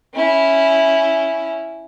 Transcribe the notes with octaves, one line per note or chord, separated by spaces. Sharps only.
C#4 E4